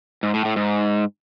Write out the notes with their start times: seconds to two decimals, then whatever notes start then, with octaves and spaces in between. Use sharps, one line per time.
0.23 G#2
0.34 A2
0.45 A2
0.56 G#2